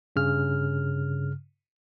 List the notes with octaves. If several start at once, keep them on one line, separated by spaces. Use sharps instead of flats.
G2 C#3 F6